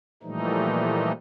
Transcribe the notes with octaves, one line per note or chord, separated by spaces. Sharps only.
A#2 E3 F3 G3 A3 D#4